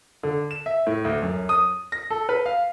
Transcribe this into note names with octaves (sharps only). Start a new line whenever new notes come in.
D3
E7
E5
A2
D2
F#2
D#6
A#6
A4
B4
F5